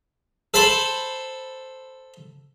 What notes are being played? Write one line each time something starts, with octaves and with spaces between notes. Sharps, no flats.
A4 C5 A5 B5